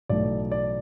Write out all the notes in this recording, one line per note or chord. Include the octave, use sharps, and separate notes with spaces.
B1 A2 E3 A3 D5
D5